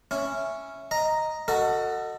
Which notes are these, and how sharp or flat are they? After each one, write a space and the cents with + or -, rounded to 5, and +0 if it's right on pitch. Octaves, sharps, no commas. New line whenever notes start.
C#4 +0 E4 +0
D#5 +0 A#5 +0
F#4 +0 A4 +30 D#5 +0